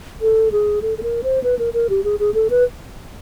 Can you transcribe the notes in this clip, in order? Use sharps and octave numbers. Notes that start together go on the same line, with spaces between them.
A4
G#4
A4
A4
A#4
C5
B4
A#4
A#4
G4
G#4
G#4
A4
B4